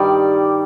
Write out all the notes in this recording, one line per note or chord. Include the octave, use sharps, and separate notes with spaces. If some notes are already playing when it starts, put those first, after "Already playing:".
Already playing: G2 D#3 G3 D5